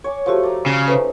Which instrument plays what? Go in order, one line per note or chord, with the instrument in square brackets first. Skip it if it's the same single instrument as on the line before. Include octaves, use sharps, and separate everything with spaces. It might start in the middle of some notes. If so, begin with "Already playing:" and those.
[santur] C#5 G#5 D6
[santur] F3 A3 [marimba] F#4 G4 C5
[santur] D5 A#5
[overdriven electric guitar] C#3
[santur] A3 C#4 D#4 [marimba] B4 C5